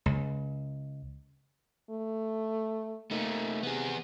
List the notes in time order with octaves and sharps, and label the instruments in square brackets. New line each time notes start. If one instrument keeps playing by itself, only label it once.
[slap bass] C#2
[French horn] A3
[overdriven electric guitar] A3 D#4 [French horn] A#3
[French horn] C3 [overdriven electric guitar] B3 G#4